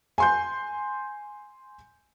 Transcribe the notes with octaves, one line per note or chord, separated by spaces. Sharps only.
G#5 C6 G6